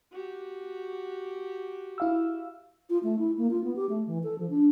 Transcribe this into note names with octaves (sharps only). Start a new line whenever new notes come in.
F#4 G4
E4 F5 E6
F4
A3
E4
A#3
F4
B3
G4
A3
E3
A4
F3
D4